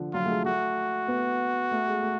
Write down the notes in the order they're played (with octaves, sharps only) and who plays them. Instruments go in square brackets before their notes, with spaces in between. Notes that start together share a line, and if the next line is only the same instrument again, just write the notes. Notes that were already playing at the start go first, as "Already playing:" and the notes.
Already playing: [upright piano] D3 F3
[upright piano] F#3 [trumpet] F4
[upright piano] A3
G#3
[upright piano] A3 [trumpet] F#4
[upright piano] B3
A3
G#3
A3